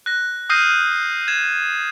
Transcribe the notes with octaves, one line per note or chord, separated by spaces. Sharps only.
F#6 A#6
D#6 F6 G6 A#6 C7 D#7
G#6 E7